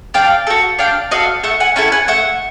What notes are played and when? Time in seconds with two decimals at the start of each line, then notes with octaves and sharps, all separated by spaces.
0.14 D4 F5 G5
0.47 F#4 A4
0.79 D4 F5 G5
1.11 F#4 D#5 F5
1.15 A4
1.43 A3 E5 F#5
1.60 F#5 G#5
1.76 C#4 E4 A4 G5 A5
1.92 F#5 G#5
2.08 A3 E5 F#5